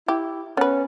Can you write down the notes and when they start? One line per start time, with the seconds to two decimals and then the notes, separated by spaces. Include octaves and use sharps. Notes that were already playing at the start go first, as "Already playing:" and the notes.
0.08 E4 G4
0.57 B3 C#4 B4